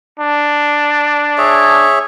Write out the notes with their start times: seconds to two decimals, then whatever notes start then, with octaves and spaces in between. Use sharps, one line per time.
0.20 D4
1.38 G#4 C#5 E5